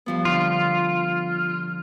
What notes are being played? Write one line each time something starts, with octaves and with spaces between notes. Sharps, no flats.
G2 F3 B3
D3 F4